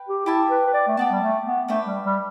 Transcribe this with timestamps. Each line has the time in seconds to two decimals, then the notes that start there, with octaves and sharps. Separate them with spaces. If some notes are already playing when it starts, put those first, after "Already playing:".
Already playing: B4 G5
0.09 G4
0.26 E4 G4 E5 A5
0.50 B4
0.66 B4
0.74 D5
0.87 A3
0.97 B3 G4 D5 A5
1.11 G3
1.21 A3
1.45 B3
1.68 A3 D4 B4 E5 G5
1.86 G3
2.04 G3